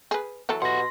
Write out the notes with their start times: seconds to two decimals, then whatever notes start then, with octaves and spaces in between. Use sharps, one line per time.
0.11 G#4 B4
0.49 E3 F#3 A4
0.62 B2 G4 F#5 C6 A#6